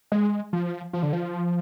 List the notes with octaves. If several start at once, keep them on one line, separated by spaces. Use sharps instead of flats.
G#3
F3
F3
D3
F3